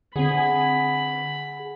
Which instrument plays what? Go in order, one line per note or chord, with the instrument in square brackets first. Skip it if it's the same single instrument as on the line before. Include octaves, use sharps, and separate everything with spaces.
[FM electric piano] D3 C4 [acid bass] G#4 [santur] F#5 [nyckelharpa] B5